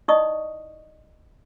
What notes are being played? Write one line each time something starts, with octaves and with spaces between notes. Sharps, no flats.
D#4 E4 D5 D#5 C#6 D#6